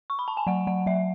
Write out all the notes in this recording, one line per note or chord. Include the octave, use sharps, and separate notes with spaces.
C#6
B5
A5
G#5
F#3 F#5
F#3 F#5
F#3 E5